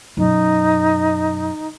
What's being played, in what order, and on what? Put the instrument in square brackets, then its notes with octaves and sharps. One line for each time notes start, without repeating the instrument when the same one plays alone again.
[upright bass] F#2 B2 [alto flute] D#4